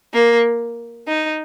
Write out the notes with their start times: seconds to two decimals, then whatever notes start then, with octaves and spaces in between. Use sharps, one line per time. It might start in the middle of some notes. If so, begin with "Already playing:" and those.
0.14 A#3
1.07 D#4